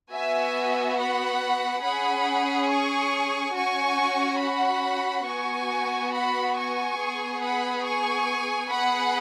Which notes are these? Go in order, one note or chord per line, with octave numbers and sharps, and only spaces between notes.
B3 F#4 E5 G#5
F#5 B5
C#4 G#4 F#5 B5
G#5 C#6
C#4 F#4 G#5 C#6
F#5 B5
B3 F#4 G#5 C#6
F#5 B5
G#5 C#6
B3 G#4
F#5 B5
G#5 C#6
B3 G#4 F#5 B5